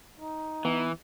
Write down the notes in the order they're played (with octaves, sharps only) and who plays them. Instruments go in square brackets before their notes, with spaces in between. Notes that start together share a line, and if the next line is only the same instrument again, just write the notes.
[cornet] D#4
[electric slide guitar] E3 [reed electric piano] B3